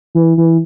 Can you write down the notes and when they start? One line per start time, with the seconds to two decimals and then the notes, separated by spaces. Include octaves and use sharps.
0.15 E3
0.37 E3